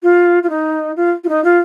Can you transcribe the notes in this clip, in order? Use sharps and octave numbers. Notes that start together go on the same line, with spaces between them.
F4
F4
D#4
F4
F4
D#4
F4